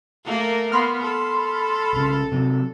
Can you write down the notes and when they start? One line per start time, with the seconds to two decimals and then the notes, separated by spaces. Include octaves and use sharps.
0.24 A3 A#3 A#4
0.72 A#3 B3 B5 C6 F6
1.02 A4
1.93 B1 C#3
2.32 C3 F#3